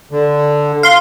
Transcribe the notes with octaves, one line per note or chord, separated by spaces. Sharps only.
D3
F5 C6